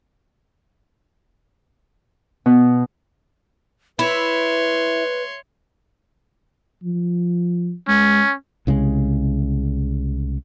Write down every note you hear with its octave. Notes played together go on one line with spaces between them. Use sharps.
B2
E4 B4 C#5 C6
F3
G#3 C#4
C2 C#3 E3 G#3